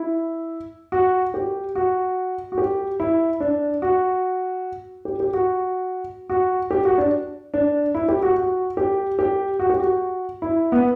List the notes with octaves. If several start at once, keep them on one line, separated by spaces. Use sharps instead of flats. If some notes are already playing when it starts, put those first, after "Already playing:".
Already playing: E4
F#4
G4
F#4
F#4
G4
E4
D4
F#4
G4
G4
F#4
F#4
G4
F#4
D4
D4
E4
G4
F#4
F#4
G4
G4
F#4
G4
F#4
E4
B3